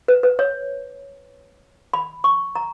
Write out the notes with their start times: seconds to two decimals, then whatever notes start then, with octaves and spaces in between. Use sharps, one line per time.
0.08 B4
0.23 B4
0.39 C#5
1.93 B5
2.24 C#6
2.55 A#5